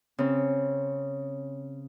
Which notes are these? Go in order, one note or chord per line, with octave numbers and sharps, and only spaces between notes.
C#3 C4